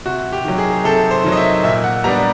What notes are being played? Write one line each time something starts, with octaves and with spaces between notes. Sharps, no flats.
C3 F#4
G4
D#3 F#3
G#4
C3 A4
C5
D#3 F#3
D#5
E5
A#2 E5
F#5
G3 B3 D4 A#5